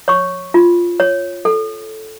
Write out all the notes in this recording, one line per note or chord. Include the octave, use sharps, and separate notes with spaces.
C#5 C#6
F4
C#5
A4